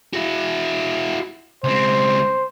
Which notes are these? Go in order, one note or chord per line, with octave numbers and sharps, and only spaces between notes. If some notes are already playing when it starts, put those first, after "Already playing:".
E4 F#4
C#2 C4 C5